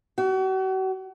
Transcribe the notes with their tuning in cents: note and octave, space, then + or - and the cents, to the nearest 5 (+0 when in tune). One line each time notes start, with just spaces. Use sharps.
F#4 +40